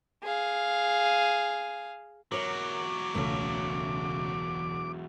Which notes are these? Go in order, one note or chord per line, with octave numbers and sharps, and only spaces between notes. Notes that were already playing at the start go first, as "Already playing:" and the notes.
G#4 F5
E2 F#3 A#4 C#5 D6
E1 C#2 C#3 A3